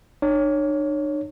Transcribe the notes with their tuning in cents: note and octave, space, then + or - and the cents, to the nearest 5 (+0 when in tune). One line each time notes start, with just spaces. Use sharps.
D4 +45 C#5 +0